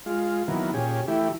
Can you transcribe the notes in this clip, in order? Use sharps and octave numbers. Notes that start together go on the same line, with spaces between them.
G#3 F4
D#3 E3 F#3 A#3 B3
A#2 C#4 G4 G#4
E3 A3 E4 G4